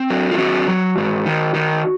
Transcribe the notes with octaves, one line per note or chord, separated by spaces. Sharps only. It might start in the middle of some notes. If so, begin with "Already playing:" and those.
Already playing: C4
F#3
F4
C4 F#4
F#3
G#2
D#3
D#3